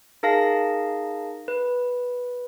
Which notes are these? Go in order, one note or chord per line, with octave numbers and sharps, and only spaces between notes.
D#4 G#4 A#4 F5 A5 A#6
B4